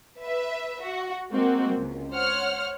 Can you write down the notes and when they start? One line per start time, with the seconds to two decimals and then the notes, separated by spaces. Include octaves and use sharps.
0.19 B4 E5
0.82 F#4
1.31 G#3 A#3 C4 F#4
1.74 C#2
2.12 C5 C#5 F#5 F6